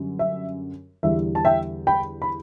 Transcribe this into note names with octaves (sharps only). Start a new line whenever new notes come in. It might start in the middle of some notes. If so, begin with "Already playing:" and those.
Already playing: F#2 D3 G3
E5
E2 D3 G3 E5
A5
E5 G5
G5 B5
B5